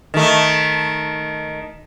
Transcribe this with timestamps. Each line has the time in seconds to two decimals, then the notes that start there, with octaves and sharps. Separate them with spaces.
0.14 D#3 A3